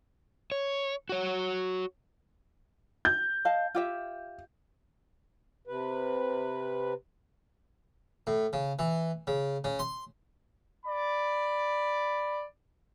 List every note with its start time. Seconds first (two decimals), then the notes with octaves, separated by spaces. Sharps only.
0.52 C#5
1.09 F#4 C#5
3.05 G6
3.45 D#5 F5 A5
3.75 F4 G4 E5
5.67 C3 B4
8.27 A2
8.53 C#3
8.79 E3
9.27 C#3
9.64 C#3
9.79 C6
10.86 D5 B5